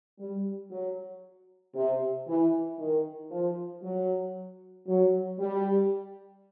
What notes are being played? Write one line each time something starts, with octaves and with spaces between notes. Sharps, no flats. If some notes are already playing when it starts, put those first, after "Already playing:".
G3
F#3
C3
E3
D#3
F3
F#3
F#3
G3